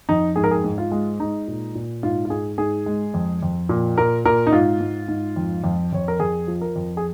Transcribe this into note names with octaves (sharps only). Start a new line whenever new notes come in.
F2 D#4
G#2 G#4
A#4
G#4
G#2
F4
G#3
G#3 D#4
A#2
A#2
G#2 F4
F4
G#2 G#4
G#2 G#4
G#3
F2
F2
A#2
A#2 A#4
A#2 A#4
D#4
G#2 F4
G#2
G#2
F2
F2
F2 C#5
A#4
F2 G#4
F3
A#4
F2
G#4